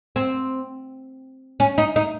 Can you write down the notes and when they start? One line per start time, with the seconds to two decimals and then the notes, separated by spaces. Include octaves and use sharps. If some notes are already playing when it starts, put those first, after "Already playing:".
0.16 C4
1.60 C#4
1.78 D#4
1.96 D#4